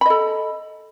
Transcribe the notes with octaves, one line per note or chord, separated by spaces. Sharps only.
A4 D#5 B5